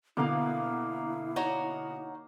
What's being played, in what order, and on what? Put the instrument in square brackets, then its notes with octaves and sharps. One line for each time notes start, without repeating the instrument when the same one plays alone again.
[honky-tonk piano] B2 D3 [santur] A#3 F5 [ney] E4
[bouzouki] D#4 F#4 C#5